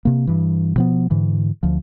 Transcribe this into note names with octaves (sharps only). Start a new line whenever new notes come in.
C3 A#3
G2 E3
B2 F3 B3
G#2 D3 E3
D2 F3